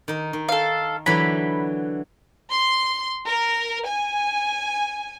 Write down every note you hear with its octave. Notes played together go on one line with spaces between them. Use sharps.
D#3 D#4
D#3
A4 F5
D3 E3 F#3 B5
C6
A#4
G#5